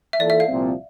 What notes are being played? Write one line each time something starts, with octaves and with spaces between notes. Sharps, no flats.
E5
E3 A#3 F4 A4 D5
E5
F5
C2 A#2 F3 C4